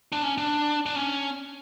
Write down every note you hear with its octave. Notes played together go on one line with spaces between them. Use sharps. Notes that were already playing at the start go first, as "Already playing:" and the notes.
D4
C#4
D4
D4
C#4